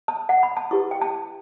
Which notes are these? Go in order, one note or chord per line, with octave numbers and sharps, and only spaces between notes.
A5
F#5
B5
A5
E4 G4 B4 C#6
G5
A5